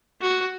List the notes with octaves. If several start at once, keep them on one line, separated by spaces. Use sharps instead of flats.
F#4